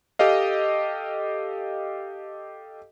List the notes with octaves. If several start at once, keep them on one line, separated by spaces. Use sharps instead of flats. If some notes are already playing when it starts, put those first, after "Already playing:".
G4 A4 D#5 F5